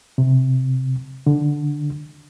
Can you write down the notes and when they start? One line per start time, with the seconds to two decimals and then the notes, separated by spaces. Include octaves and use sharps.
0.18 C3
1.27 D3